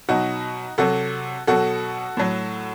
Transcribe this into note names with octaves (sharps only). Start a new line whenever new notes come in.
B2 F#3 D#4 F#4
C3 F#3 F#4 A4
B2 F#3 F#4 A4
A2 F#3